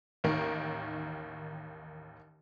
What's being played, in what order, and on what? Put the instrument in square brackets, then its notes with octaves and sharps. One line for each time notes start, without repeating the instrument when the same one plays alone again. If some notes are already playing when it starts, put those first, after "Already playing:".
[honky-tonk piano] A1 D#2 D#3 A#4